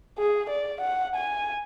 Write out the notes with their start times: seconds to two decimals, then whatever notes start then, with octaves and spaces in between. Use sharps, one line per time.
0.18 G#4
0.50 D5
0.81 F#5
1.16 G#5